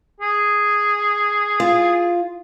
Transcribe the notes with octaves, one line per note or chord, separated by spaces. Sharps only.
G#4
F4